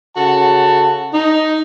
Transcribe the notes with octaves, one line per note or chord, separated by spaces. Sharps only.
C#3 F#4 A4 F#5 A5
D#4